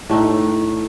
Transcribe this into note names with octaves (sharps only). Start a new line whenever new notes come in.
A2 A3 D#4